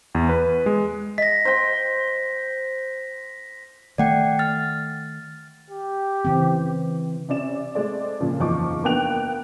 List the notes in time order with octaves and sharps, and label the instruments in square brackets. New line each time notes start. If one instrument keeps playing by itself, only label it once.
[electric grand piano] E2
B4
G#3
[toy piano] D#5 [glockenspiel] A#6 B6
[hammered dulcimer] C5 G5
[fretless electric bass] D#3 A3 [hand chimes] D5 F#5 G5
[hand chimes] F6 A6
[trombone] G4
[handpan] C#3 E3 C4
[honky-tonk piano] C3 C#4 D5 E7
G#3 A3 C4 D5
A#2 C#3 F3
F#1 E2 F3 D#4 C#6 D6
A#3 B3 D4 G5 F#6 F7